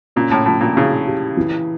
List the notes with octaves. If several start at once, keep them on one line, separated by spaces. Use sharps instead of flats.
A#2 C#4
A2
A2 F3
A#2
C#3 E4
G4
E3